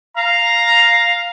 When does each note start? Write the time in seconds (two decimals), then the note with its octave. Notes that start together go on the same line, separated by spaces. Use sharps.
0.17 F5 A#5